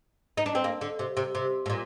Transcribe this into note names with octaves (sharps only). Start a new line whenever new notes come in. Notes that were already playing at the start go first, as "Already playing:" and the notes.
D#4
D4
C4
A#3
D3
C3
C3
C3
A2
A#2